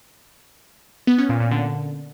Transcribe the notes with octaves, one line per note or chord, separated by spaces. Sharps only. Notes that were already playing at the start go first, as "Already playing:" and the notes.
B3
C#4
A#2
A#2
D3